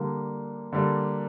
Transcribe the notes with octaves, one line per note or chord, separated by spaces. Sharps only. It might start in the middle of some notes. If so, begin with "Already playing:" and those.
Already playing: D3 G3 A#3
D3 G3 A#3